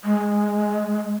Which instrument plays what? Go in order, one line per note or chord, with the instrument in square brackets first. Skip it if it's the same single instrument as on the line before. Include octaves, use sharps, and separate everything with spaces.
[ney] G#3